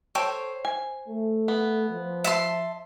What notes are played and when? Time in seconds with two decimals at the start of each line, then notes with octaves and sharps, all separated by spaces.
0.15 A4 C5 C#5 G5
0.65 G#5
1.08 A3
1.48 B3
1.90 F3
2.24 E5 A5 C6